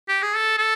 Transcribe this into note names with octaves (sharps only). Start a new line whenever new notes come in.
G4
G#4
A4
A4